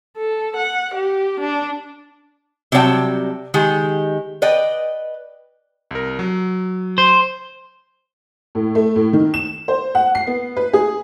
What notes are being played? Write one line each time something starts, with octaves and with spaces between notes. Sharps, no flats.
A4
F#5
G4
D4
C3 F#3 G3 D4 G5 A5
D#3 G#3 G4
B4 D5 D#5 G5
C2 A#4
F#3
C5
A2
A3
A2
D#3
E7
C5
F#5
C7
B3
B4
G#4